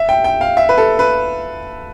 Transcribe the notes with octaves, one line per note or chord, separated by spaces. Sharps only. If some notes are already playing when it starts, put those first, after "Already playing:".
Already playing: E5
G5
G5
F5
E5
B4
A4
B4